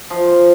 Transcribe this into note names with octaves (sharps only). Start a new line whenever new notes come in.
F3